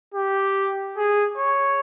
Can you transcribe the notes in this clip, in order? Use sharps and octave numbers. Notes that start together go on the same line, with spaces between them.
G4
G#4
C#5